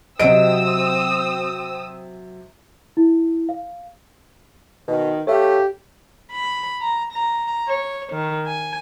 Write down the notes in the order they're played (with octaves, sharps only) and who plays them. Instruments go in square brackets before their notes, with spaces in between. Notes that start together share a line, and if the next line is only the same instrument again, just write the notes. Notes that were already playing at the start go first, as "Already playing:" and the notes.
[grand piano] C3 D7 [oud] F#3 D#5 [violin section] C4 D#6 E6
[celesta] E4
F5
[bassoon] B2 [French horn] D#3
[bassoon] A3 [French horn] G4 [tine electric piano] C#5 E5 F5
[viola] B5
A#5
A#5
C#5
D#3
G#5